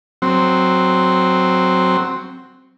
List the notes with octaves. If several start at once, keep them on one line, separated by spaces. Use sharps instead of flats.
F#3 C4